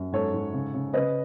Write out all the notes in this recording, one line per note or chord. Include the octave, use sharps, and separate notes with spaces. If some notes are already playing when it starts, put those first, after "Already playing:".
Already playing: F#2
G#2 A4 C#5
G#2
C#3
C#3
C#3 B4 D#5